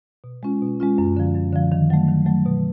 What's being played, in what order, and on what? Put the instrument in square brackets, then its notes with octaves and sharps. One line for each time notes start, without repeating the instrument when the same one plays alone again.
[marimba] B2
G#3 C#4 F4
B2
G#3 C#4 F4
F#2
D3 F3
F#2
D3 F3
D#3
F#3 A3
D#3
F#3 A3
B2